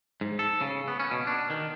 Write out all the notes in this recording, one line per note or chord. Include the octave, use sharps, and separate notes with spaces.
G#2
A4
C#3
B3
C#4
B2
D4
D#3